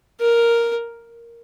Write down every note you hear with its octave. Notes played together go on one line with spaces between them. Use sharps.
A#4